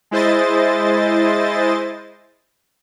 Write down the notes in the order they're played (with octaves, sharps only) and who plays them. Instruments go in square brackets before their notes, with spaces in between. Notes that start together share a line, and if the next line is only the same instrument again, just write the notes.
[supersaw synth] G#3 E4 C5 D#5 A6